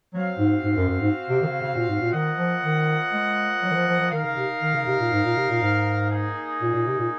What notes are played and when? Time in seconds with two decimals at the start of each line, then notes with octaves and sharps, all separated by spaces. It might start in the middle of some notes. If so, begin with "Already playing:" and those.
0.14 F#3 C4 F#4 C5 F5
0.38 G#2
0.63 G#2
0.76 F#2
0.88 F#2
1.00 G#2
1.30 C3
1.42 D#3
1.46 C#3
1.62 C#3
1.75 A#2
1.88 G#2
2.00 A#2
2.13 D#3 A#3 F4 C5 D#5 F#5
2.38 F3
2.63 D#3
3.13 G#3
3.62 F#3
3.70 D#3
3.75 F3
3.87 F3
4.00 F3
4.12 D#3 D#4 A#4 F5
4.24 C#3
4.37 C3
4.62 D#3
4.74 C#3
4.87 C3
4.99 A#2
5.12 G#2
5.24 A#2
5.37 C3
5.49 A#2
5.62 G#2
6.11 A#3 D#4 G#4
6.61 A#2
6.73 A#2
6.86 C3
6.98 A#2